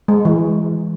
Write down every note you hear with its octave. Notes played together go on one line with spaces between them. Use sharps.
G#3
E3